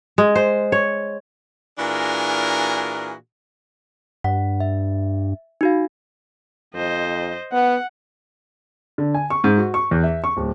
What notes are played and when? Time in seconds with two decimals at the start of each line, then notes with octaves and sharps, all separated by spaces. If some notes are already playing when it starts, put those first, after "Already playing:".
0.18 G#3
0.36 C5
0.72 C#5
1.79 A#2 E3 D4 F#4 G#4 A#4
4.24 G2 F#5
4.60 E5
5.61 D#4 F#4 F5
6.75 F2 C5 D#5
7.52 B3 F#5
8.98 D3
9.14 G#5
9.30 C#6
9.44 G#2
9.58 F#4
9.74 C#6
9.91 E2
10.03 E5
10.24 C#6
10.37 D1